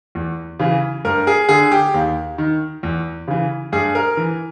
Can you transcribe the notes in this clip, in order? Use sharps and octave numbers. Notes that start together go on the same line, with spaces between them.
E2
C#3 E3
G2 A#4
G#4
D3 G#4
G4
D#2
D#3
E2
C#3 E3
G2 G#4
A#4
E3